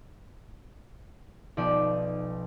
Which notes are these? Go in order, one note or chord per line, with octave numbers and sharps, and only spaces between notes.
B1 F3 D5 G5 D#6